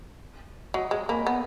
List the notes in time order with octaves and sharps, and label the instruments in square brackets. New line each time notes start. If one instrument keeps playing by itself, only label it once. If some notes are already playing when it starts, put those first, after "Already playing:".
[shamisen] F#3 [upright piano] D#5
[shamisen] G#3 [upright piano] D#5
[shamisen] A#3 [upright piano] G#5 B5
[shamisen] B3